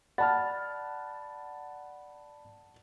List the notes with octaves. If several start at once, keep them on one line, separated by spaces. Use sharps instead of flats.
D5 F#5 A5 B5 F6 A6